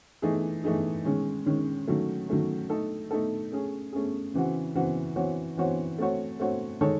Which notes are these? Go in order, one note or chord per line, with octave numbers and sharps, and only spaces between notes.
E3 A3 D#4 G#4
E3 A3 D#4 G#4
D#3 G#3 C#4
D#3 G#3 C#4
D#3 F#3 A3 C#4
D#3 F#3 A3 C#4
A3 D#4 A4
A3 D#4 A4
A3 C#4 G#4
A3 C#4 G#4
C#3 E3 C4 F#4
C#3 E3 C4 F#4
E3 C4 F#4 C#5
E3 C4 F#4 C#5
A3 C4 F#4 C#5
A3 C4 F#4 C#5
D#3 G#3 D#4 A4 C#5